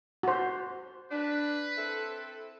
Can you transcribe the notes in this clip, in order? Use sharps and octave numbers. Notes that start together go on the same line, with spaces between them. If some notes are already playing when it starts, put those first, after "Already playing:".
F#4 C5
D4 B4
C4 E4 A4